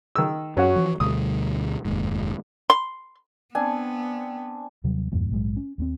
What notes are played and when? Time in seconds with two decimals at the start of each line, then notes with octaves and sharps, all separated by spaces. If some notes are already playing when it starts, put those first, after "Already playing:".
0.16 D#3 E6
0.57 F#2 F#3 C#4 F#4
0.76 E3 F3
1.00 D2 B2 G3 D#6
1.85 F1 D#2 G#2
2.70 C6
3.55 B3 C4 D4 G#5
4.84 D#2 C3 F#3 G3
5.12 E2 G2 A#2 E3
5.31 A#1 G#2 F#3 G#3
5.57 C#4
5.78 D#2 A#3 C4